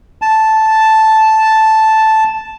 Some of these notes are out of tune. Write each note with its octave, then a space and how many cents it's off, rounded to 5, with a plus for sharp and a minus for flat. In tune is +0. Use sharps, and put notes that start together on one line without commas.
A5 -5